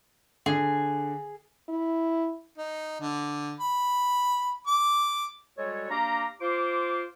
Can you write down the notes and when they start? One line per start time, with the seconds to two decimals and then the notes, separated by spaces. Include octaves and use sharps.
0.46 D3 G#4
1.69 E4
2.58 D#4
3.01 D3
3.60 B5
4.67 D6
5.58 G3 G#3 F#4 A4 C#5
5.90 A#3 D4 G4 F5 A#5
6.41 F4 C5 D6